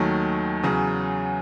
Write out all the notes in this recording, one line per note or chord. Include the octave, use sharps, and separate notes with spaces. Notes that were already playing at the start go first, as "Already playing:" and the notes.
Already playing: D#2 D#3 F#3 A3 G#5
E2 C#3 F#3